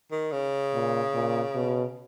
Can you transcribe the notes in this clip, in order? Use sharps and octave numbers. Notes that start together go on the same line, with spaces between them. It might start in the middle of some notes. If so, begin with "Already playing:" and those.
D#3
C#3
A#2
A#2
B2